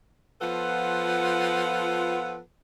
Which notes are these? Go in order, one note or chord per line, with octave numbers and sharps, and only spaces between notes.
F3 B3 F4 A4 B4 F#5